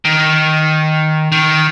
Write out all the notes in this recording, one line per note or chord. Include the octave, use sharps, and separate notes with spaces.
D#3
D#3